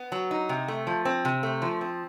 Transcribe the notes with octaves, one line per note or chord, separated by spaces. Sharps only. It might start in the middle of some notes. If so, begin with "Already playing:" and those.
Already playing: B3
F#3
D#4
C3
A3
F3
C4
C3
A3
F3
C4